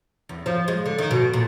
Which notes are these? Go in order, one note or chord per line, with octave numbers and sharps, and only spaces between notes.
E2
F3
G#3
D3
D#3
B2
A#2